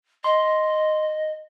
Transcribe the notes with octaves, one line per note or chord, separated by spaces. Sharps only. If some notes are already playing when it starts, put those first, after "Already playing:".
D#5 C6